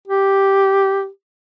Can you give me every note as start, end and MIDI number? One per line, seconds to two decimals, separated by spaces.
0.07 1.08 67